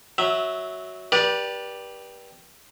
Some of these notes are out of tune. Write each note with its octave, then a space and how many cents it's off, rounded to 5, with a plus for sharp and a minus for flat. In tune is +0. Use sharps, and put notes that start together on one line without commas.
F#3 +0 E5 -15
G4 +0 B4 -35 D5 +0